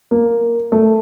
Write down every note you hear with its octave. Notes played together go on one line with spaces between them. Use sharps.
A#3
A3